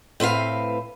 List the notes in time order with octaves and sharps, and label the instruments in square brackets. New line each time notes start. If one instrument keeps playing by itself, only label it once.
[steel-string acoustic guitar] A2 C4 B4 F5